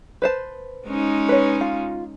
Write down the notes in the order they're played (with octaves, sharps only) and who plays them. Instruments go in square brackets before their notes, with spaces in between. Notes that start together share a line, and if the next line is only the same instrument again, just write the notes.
[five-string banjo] B4 C5 A5
[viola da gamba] G#3 C#4 D#4
[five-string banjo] B4 C#5
F4